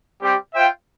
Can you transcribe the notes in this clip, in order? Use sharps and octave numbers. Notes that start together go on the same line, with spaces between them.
G3 C4 G4
F4 C5 E5 G5